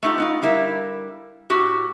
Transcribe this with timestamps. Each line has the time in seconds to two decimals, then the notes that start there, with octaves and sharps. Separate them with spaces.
0.03 A3 B3 D#4 F4 G4
0.18 B3 D#4 F4
0.42 D3 G3 E4 A#4 F5
1.50 A2 F#4 G4